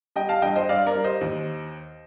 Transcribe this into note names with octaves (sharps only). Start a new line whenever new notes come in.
G3 D#5 G5
F5 A5
G2 D#5 G5
C5 D#5
G2 D5 F5
A#4 D5
G3
C5 D#5
D#2